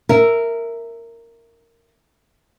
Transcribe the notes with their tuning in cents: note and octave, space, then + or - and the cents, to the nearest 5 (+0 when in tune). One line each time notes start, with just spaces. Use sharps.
A#4 -10 E5 +0